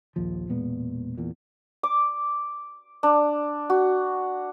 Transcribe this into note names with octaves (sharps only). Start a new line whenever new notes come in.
D#1 A#1 D#2 F3
E1 A#2 G#3 B3
E2 A#2
D6
D4
F#4